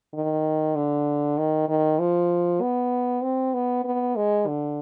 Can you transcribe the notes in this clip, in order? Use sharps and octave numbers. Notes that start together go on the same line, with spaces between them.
D#3
D3
D#3
D#3
F3
B3
C4
B3
B3
G#3
D3